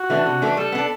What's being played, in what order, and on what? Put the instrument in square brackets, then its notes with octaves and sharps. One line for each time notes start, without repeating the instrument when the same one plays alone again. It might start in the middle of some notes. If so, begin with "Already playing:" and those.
Already playing: [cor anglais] F#4
[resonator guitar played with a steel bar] E3 A3 D4
C3
E3 A3 D4
[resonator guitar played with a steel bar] G3 [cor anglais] A4
[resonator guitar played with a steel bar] B3 D4